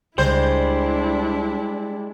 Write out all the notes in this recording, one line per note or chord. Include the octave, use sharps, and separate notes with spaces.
C#2 G3 G#3 D4 E4 C5